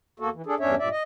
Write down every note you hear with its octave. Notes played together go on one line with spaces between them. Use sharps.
E2 A#3 F#4 A4
E3
D4 G#4 A4
E2 G2 C#4 D4 C#5 E5
G2 A#2 D5 E5
D#5